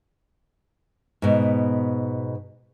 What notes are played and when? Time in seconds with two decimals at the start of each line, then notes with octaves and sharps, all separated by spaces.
1.22 G#2 B2